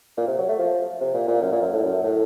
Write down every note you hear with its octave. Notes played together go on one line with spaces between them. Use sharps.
A#2
C3
F#3
A3
F3
C3
A#2
A#2
F#2
A#2
F#2
A2
F#2
A2